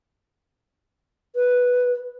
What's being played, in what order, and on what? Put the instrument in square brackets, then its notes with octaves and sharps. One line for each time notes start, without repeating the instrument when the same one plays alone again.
[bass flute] B4